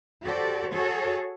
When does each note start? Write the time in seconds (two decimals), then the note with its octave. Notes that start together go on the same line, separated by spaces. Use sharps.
0.24 F#4 G4 A4 C5 D5
0.72 F#4 G#4 A4 C#5